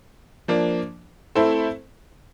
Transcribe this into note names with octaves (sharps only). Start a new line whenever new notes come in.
F3 A#3 D4
A3 C4 E4 A4 C5